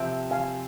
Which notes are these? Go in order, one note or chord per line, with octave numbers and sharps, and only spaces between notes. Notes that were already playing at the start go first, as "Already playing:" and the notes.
Already playing: C3 F3 C4 E5 G5
F5 G#5